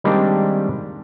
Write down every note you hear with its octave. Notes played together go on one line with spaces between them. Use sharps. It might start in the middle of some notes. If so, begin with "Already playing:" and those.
D#3 G3 G#3 A#3 C4 D4